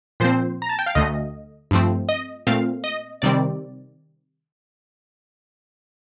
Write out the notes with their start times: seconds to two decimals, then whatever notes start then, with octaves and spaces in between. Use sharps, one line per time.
0.20 A#2 F3 C4 C5
0.62 A#5
0.69 A5
0.79 G5
0.86 F5
0.95 D2 D3 A3 D#5
1.71 G2 F3 A3 C4
2.09 D#5
2.47 A#2 A3 C4 F5
2.84 D#5
3.22 C3 D#3 G3 C4 D5